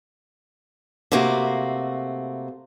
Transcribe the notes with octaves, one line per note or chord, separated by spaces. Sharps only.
C3 A3 A#3 F#4